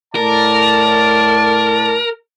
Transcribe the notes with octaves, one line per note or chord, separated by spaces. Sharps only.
A2 A#4 D5 A5